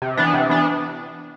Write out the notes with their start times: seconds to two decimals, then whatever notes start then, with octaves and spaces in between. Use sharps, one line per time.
0.02 C3
0.17 E3 B3 D4
0.34 C3
0.49 E3 B3 D4